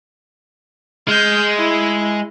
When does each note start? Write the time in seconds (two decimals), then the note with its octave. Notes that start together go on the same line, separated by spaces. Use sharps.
1.08 G#3 F6 G6
1.58 E4